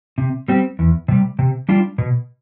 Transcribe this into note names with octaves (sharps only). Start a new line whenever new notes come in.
C3
G3 C4 G4
E2
C3 G3
C3
G3 D4 F4
B2